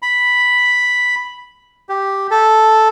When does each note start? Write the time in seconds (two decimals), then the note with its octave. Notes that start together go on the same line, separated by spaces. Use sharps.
0.02 B5
1.89 G4
2.31 A4